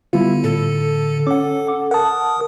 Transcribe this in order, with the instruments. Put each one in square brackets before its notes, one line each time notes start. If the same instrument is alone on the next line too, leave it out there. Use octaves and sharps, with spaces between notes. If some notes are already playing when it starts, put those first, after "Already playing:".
[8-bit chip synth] D3 [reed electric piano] G3 B3 F4 [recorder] E4
[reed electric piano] A2 [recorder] A4
[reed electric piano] C#4 [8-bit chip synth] F#5 D6
[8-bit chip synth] A#4 D#6 [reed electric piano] F#5 A5